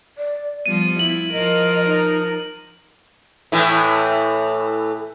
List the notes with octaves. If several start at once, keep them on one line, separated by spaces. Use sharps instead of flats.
D5
F3 G3 B3 D#7
E4 F#7
F3 A#4 D#5
D#4
A2 E3